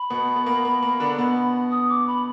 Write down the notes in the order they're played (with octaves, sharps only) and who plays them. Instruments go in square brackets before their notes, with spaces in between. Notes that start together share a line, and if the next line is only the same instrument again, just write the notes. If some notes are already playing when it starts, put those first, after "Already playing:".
Already playing: [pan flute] B5
[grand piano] B2 B3
B3
A#3
A#3
A#3
D3 D4
B2 B3
[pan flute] D#6
D6
B5